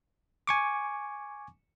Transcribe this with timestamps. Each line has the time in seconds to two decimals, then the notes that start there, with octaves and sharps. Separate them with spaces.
0.47 G#5 C#6 D6